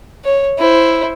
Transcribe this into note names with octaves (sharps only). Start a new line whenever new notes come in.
C#5
E4 C5